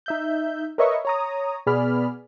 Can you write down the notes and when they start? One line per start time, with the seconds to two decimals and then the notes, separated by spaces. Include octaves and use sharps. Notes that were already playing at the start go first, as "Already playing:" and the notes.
0.06 D#4 E5 G6
0.78 A#4 B4 C#5 D#5 E5 C#6
1.05 C#5 A#5 D#6
1.66 B2 B3 G#4 D5 B5 F6